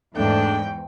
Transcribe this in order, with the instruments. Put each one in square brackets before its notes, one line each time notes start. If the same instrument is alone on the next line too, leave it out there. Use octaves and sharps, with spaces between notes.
[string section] E2 G#2 [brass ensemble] A3 D4 [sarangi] G5